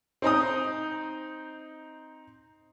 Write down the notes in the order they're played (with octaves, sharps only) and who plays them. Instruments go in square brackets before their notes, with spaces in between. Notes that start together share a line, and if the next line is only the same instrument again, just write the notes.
[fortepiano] C4 D#4 A#5 D#6